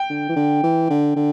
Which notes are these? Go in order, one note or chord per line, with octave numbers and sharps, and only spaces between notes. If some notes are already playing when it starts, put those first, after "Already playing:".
Already playing: G5
D3
E3
D3
E3
D3
D3